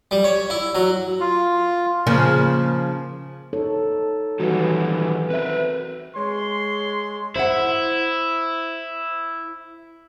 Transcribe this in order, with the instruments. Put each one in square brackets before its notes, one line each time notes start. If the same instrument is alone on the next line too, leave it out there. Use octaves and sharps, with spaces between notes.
[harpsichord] G3
C#5
E4
F#3
[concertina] F4
[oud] C#3 F3 A#3
[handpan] D#4 A4 C#5
[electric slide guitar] D#3 F#3 G3 [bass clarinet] E3 [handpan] F#4
[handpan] C4 E5 [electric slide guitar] A#4 B4
[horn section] G#3 C#5 C6
[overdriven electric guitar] E4 [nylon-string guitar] C5 E5 F#5